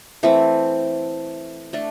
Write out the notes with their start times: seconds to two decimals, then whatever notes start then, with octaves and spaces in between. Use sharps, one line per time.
0.23 E3 A3 C4
1.73 A3 D4 A4